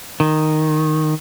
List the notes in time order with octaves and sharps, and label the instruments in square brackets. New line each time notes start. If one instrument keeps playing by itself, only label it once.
[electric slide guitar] D#3